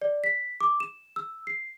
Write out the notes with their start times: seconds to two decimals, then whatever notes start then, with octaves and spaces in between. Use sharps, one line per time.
0.02 D5
0.24 B6
0.61 D6
0.80 E7
1.16 E6
1.47 C7